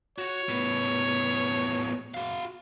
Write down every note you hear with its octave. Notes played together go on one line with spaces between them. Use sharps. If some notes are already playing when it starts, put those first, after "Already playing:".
F#4 C#5
A2 B3
F#4 F5